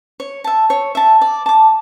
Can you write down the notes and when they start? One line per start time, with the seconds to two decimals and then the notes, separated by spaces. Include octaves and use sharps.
0.20 C#5
0.44 E5 A5
0.70 C#5
0.95 E5 A5
1.21 D5
1.46 A5 D6